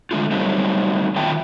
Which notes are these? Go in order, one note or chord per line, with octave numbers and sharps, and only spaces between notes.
D3 G#3 A3 D4 F4
F#3 G3 A3 C4 D#4
D#3 F4 E5 G5 A5